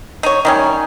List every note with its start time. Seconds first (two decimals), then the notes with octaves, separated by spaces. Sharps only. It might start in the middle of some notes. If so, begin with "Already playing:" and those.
0.23 D#4 C#5
0.45 D#3 G3 C#4 D#4 G#5